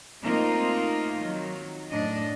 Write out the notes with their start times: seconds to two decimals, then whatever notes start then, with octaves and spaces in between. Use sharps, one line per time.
0.22 A3 A#3 C4 D#4 F4 A#4
1.19 D#3 F#3
1.88 F#2 A2 D4 D#5